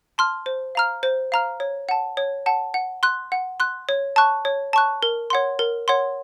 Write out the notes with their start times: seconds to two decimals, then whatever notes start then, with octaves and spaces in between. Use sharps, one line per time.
0.18 A5 C6 F6
0.46 C5
0.75 F5 A#5 F6
1.03 C5
1.32 F5 A#5 F6
1.60 C#5
1.89 F#5 A5
2.17 C#5
2.46 F#5 A5
2.74 F#5
3.03 C6 F#6
3.32 F#5
3.60 C6 F#6
3.89 C#5
4.16 A5 C#6 F#6
4.45 C#5
4.73 A5 C#6 F#6
5.03 A#4
5.30 C#5 F#5 C6
5.59 A#4
5.88 C#5 F#5 C6